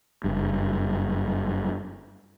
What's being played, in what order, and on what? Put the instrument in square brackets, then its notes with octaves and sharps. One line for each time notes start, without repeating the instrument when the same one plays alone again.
[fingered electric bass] F#1 G2